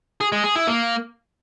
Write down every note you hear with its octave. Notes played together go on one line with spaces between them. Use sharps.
G#4
G#3
G#4
E4
A#3